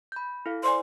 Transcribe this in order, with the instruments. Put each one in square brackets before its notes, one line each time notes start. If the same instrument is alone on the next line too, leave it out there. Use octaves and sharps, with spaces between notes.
[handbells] B5 G6
E4 A4 F5
[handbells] C5 D5 G#5 [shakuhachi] C6